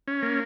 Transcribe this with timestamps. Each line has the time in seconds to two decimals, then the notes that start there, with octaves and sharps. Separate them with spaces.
0.08 C#4
0.22 A#3